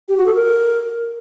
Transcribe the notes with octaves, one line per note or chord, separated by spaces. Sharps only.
G4
F#4
A4
A#4